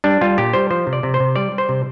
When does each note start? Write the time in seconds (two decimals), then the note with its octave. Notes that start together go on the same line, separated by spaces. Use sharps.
0.04 G3 D4
0.21 G3 F4
0.38 A#2 G4
0.53 G3 C5
0.70 F3 C5
0.87 C3
0.93 D5
1.03 C3
1.14 C5
1.20 C3
1.36 G3 D5
1.52 G3
1.58 C5
1.69 C3